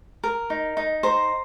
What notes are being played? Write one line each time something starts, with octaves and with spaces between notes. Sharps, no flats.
A#4
D#4
D#4
C5 A#5